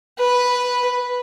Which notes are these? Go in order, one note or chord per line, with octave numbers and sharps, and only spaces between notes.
B4